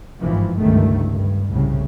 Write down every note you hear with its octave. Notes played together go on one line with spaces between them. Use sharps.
G#1 G2 E3 F3
G1 C#2 G2 D#3 A3
G2
C2 A2 C#3